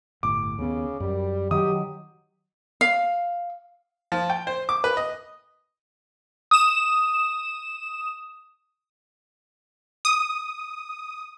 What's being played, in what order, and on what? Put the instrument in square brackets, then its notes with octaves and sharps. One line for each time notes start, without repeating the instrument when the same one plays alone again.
[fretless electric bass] G1 A2 [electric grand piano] D6
[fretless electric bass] D#2 B3 [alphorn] C#3
[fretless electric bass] F#2 [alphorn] G3
[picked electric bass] D#3 F#3 [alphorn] G4 [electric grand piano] D#6
[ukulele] F5
[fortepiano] F3
G5
C5
D6
B4
D#5
[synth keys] D#6 E7
[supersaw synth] D#6